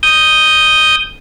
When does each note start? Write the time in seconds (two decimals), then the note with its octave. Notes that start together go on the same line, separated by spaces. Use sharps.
0.03 D#6 G6